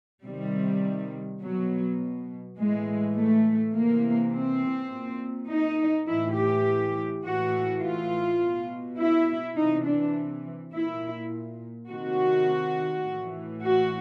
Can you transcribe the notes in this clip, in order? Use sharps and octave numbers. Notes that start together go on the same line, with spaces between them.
C3 D#3 G3
B2 F#3
A2 E3 G#3
A3
C3 E3 A#3
C4
A#2
D#4
A2 E3 E4
G4
A2 E3 F#4
F4
B2
E4
C3 E3 D#4
D4
A#2 E4
C3 D#3 F#4
A2 E3
F#4